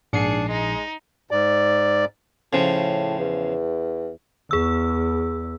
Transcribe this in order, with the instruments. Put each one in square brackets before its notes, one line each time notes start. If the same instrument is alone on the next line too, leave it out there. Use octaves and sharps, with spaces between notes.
[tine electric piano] A#1 C7 [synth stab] G#2 C#7 [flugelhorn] D4 [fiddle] G#4
[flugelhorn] G#3 [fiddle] D#4
[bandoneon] G#2 D5
[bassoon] A2 [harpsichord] C#3 F3
[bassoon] E2
[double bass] E2 [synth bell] G#4 E6